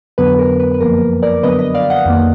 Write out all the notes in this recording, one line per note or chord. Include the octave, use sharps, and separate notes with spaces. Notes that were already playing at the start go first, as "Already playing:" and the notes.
F2 D3 F#3 B3 B4
A#4
B4
B4
F#2 F3 A#3 A#4
A#4 D5
D3 F#3 B3 B4 D#5
B4 D#5
D5 F5
D#5 F#5
F2 D#3 A#3